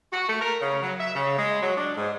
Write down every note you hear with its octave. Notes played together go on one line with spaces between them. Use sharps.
F#4
A3
A#4
C#3
F#3
E5
C#3
G#3
F#3
D4
G#2